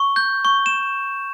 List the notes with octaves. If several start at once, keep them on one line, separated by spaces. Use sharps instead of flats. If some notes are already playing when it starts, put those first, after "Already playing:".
Already playing: C#6
G6
C#6
E7